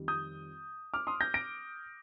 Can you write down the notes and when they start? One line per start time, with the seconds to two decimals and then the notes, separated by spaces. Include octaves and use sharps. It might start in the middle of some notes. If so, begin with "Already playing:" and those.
Already playing: F2 D#3 G3
0.08 D#6 G6
0.94 D6 F6
1.07 C6 D#6
1.21 G6 A#6
1.34 A#6 D7